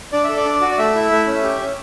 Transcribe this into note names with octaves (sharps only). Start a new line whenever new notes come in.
D4 D5
A4 E5
D5
D4
F#4
D5
A3 E5
E4
A3
C#4
G4
C#4